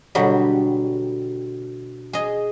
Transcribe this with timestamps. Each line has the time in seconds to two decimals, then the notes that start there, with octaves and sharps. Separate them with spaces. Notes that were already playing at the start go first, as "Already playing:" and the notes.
0.15 B2 D3 F#3 G3
2.13 G#4 D#5